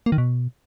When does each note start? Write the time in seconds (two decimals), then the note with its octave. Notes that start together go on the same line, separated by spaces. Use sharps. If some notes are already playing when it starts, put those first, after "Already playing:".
0.06 A#3
0.12 D#3
0.18 B2